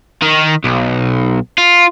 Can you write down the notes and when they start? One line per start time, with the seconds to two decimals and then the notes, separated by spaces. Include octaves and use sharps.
0.22 D#3
0.64 B1
1.58 F4